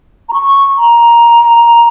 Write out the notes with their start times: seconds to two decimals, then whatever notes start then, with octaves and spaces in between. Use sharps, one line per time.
0.29 A#5
0.33 C#6
0.77 A#5